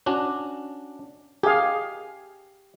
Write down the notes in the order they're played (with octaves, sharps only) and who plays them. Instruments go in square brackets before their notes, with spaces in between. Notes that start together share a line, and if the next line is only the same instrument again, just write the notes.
[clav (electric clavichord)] C#4 D4 F#4
[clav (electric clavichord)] G4 [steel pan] G#4 F5